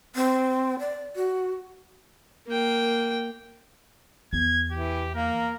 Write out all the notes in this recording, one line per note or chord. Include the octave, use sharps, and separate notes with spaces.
C4
D5
F#4
A#3 G5
E2 G#6
E3 G4
A#3 A#4